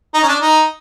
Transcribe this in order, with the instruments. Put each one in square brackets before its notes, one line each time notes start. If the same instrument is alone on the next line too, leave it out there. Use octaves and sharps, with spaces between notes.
[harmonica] D#4
C#4
D4
D#4